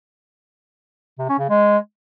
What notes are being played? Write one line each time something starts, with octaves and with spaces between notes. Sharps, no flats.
C3
C#4
C#3
G#3